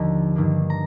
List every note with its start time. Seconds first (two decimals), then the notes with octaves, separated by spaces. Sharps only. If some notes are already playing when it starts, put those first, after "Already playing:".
Already playing: D#2 D3 F3 A#3 D#4 A#5
0.35 G2 D#3 A#3 D4
0.70 A#5